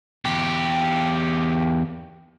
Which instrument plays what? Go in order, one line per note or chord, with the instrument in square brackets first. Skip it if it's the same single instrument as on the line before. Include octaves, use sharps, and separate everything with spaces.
[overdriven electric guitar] E2 G4